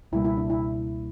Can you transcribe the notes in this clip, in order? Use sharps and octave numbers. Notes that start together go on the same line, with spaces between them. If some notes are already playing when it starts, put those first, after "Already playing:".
C#2 B2 G3 A#3 E4
E4
D4
E4